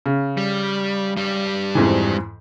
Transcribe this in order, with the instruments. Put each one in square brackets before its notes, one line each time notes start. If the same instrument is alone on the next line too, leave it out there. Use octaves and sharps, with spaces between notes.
[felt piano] C#3
[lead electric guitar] G3
G2 G3
[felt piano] F2 G#2 E3